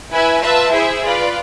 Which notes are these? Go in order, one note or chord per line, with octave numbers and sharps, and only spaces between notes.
E4 B4 E5 G#5
F4 B4 E5 A5
E4 G#4 C5 E5
F4 B4 D5